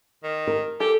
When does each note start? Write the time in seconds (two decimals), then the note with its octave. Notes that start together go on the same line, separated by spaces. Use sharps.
0.23 D#3
0.47 A#4
0.80 G4 A4